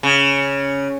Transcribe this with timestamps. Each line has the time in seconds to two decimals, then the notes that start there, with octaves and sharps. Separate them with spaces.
0.03 C#3